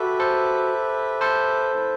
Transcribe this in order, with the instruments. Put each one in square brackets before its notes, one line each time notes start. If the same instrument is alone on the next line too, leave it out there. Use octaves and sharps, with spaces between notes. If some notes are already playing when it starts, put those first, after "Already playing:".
Already playing: [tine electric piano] F#4 A4 [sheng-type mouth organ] G4 B4 E5
[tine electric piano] A4 C5
A4 C5
[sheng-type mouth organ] A3 C4 E4 B4 E5